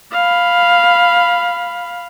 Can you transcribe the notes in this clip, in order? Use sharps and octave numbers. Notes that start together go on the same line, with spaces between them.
F5 B5